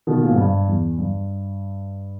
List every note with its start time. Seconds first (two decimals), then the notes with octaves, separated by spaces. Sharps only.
0.07 B2 D#3
0.21 A#2
0.30 G#2
0.38 G2
0.68 E2
0.98 G2